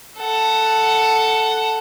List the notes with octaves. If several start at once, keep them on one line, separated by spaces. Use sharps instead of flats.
A4 F#5